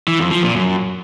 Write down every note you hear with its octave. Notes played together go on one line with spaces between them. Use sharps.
E3
F2
F3
A#2
F#2